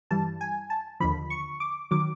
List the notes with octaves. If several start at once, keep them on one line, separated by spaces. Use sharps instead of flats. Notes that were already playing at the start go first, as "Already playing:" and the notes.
G2 E3 G3 A5
G#5
A5
D#2 D3 F3 B5
C#6
D6
D#3 F#3 D6